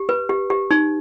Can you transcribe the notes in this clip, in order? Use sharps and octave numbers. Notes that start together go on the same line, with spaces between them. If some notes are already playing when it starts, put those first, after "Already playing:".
Already playing: G4
B4
G4
G4
D#4